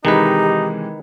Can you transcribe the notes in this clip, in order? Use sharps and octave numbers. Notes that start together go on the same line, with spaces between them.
C3 D#3 E3 G#3 D#4 G4 B4